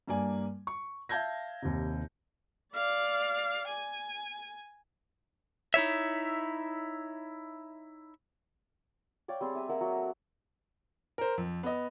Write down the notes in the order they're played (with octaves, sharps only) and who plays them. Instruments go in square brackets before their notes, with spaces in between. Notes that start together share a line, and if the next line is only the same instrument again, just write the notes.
[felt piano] G2 A#3 D5 G#5
C#6
E5 F5 A5 G6 G#6 A#6
D#2 C3
[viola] D5 F5
G#5
[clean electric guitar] D#4 E4 C#5 E5
[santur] C#5 D5 F5 G5
G3 C4 G#4
E5 G#5 A#5
A#3 A#4 E5 F#5
F#3
A4
[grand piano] A#4 C5
F2
B3 D#5